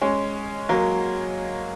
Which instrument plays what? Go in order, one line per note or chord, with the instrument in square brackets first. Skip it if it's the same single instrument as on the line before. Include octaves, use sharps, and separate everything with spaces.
[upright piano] G#3 C#4
F#3 A#3